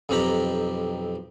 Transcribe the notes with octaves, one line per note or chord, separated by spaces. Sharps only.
B1 F2 C4 G4 A#5 B5